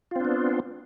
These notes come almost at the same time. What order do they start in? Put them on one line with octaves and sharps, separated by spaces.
F4 C4 D4 B3